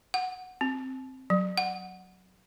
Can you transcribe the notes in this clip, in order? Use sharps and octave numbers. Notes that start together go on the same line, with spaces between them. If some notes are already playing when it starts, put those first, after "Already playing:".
F#5
C4
F#3
F#5